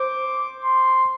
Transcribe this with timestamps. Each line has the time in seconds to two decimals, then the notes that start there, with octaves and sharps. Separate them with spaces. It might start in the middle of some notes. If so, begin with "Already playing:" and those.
Already playing: C5 D6
0.64 C6